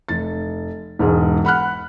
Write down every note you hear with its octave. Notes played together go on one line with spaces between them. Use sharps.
F1 A6
E1 G#2 G#4
F#5 B5 F6 F#6